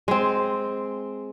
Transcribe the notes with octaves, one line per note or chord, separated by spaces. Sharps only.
G#3 C4